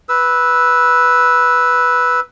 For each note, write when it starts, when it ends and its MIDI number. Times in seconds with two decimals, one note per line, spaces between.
0.09 2.20 71
0.09 2.20 88